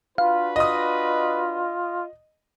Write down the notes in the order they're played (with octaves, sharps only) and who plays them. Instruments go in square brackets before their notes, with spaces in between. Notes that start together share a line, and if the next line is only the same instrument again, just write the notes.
[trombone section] D4 F#4 B4 [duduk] F4 [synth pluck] F5
[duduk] F4 [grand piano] D#5 D#6